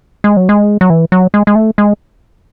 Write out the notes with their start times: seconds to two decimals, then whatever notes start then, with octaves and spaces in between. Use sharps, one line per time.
0.24 G#3
0.37 F#3
0.49 G#3
0.81 F#3
0.90 E3
1.12 F#3
1.34 G#3
1.47 G#3
1.55 A3
1.78 G#3